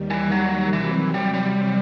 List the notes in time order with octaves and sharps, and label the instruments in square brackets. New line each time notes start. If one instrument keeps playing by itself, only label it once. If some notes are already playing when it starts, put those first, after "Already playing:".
Already playing: [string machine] D#2 D#3 G3
[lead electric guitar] E3
F#3
[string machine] C3 F#3 C4 [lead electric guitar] E3
[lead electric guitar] G3
G3